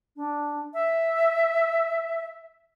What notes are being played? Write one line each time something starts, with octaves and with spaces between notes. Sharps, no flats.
D4
E5